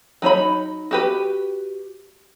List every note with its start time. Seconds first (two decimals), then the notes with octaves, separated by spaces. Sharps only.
0.22 F#3 D#4 C#5 B5
0.91 F#4 G4 B4